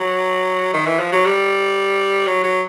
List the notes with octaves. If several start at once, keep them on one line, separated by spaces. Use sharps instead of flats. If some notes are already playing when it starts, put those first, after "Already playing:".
Already playing: F#3
D#3
E3
F3
F#3
G3
F#3
F#3